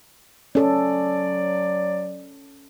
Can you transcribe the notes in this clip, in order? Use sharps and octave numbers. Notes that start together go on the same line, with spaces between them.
F#3 C#4 A4 D5